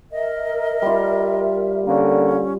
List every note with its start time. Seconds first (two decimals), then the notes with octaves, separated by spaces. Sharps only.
0.12 A#4 D#5 E5
0.82 G3 F4
1.86 D3 A#3 C#4